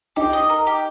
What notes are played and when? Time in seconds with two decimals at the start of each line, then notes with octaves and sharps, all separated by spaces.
0.16 D#4 G4
0.33 D#5
0.50 A#4
0.67 G4